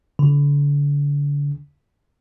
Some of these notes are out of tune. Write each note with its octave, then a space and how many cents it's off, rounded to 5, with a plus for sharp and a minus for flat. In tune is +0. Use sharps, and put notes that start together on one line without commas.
D3 -35